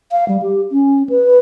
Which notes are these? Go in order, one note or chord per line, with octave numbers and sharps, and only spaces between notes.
F5
G3
G4
C#4
B4